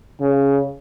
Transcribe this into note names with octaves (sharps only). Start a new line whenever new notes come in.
C#3